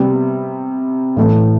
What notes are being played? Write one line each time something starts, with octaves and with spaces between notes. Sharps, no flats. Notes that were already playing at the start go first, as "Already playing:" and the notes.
Already playing: C3 G3 B3
A2 E3 A3